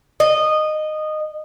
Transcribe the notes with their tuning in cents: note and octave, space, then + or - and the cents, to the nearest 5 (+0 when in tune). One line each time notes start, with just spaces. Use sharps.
D#5 -15